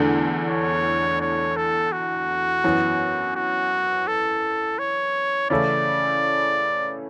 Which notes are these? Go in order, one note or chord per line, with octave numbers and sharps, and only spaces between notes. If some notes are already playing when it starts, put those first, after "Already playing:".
Already playing: E2 D3 A3 D4
C#5
C#5
A4
F#4
F#2 E3 B3
F#4
A4
C#5
C#3 E3 A3 C#4 E4 D5